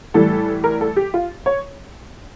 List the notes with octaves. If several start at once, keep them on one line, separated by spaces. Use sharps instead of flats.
A2 E3 G3 A4
A#4
A4
G4
F4
C#5